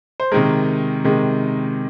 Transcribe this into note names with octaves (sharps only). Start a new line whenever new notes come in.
C5
C3 D#3 G#3 A#4
C3 D#3 G#3